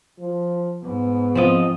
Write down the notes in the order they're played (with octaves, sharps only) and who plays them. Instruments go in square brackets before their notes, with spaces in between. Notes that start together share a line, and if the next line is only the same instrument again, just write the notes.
[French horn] F3
[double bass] G#2 [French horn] B3
[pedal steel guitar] F3 D#5 [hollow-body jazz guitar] C4 F4